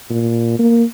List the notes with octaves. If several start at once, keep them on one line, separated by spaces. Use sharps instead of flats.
A#2
A#3